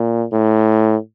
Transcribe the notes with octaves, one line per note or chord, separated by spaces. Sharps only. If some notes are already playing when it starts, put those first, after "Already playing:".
Already playing: A#2
A2